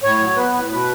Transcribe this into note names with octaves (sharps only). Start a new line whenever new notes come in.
A2 C#5
F#3
B3 B4
A2
B2 B4